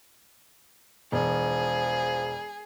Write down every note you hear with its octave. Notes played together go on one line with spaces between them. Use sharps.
E1 F3 G#4